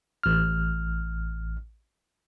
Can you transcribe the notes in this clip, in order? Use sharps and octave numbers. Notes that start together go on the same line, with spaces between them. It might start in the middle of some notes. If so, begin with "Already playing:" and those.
A1 F6